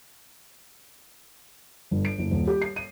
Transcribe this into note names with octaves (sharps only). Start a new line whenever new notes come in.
G1
D7
F#1
D#1
G4
C7
D#7